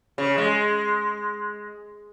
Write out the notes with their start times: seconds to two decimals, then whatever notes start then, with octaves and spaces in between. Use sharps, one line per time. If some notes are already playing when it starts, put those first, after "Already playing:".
0.18 C#3
0.38 G#3